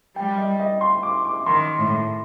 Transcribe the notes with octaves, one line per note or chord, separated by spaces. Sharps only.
G3 G5
D#5
D#5
C6
D6
D6
D#3 C6
A2